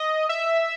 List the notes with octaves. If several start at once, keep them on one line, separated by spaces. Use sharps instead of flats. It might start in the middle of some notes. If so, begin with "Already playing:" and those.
Already playing: D#5
E5